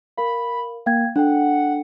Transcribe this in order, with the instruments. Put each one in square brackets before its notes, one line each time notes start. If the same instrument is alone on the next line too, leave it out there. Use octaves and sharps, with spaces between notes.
[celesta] A#4 F5 [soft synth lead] B5
[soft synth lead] A#3 [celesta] F5 G5 G#6
[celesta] D4 A4 G5 [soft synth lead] F#5